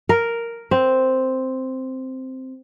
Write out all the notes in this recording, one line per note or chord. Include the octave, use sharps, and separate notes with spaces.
A#4
C4